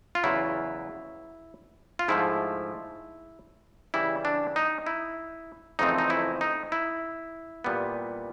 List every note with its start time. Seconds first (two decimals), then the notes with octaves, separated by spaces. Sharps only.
0.15 F4
0.24 E2 C#3 F#3 E4
1.99 F4
2.08 G#2 F3 A3 E4
3.94 C#3 E3 G3 E4
4.25 D4
4.56 D#4
4.86 E4
5.79 F2 C#3 E3 A3 C4 D#4
5.98 D#4
6.10 E4
6.41 D#4
6.72 E4
7.64 A#2 G3 B3